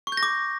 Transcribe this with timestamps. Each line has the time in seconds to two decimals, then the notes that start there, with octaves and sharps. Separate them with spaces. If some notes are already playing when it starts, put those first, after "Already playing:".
0.07 C#6
0.12 G6
0.17 A#6
0.23 D6